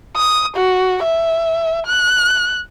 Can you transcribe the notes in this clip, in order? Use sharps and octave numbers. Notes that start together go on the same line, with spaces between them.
D#6
F#4
E5
F#6